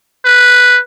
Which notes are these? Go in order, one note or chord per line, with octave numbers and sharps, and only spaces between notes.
B4